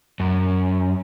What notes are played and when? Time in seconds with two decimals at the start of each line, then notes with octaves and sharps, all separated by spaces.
0.20 F#2